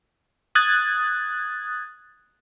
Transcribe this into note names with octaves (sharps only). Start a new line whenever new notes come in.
D#6 F#6 G#6 A6